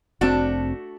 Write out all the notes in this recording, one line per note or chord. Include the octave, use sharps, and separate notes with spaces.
F1 A3 C4 D4 F#4